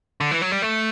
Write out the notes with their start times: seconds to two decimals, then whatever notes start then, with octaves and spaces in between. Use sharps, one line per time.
0.21 D3
0.31 E3
0.42 F#3
0.52 G3
0.62 A3